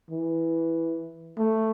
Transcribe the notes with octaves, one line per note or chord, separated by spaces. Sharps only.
E3
A3